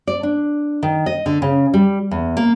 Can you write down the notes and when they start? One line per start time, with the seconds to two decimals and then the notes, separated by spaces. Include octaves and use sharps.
0.07 D5
0.23 D4
0.83 D#3
1.06 D#5
1.26 D3
1.42 C#3
1.74 G3
2.11 E2
2.37 A#3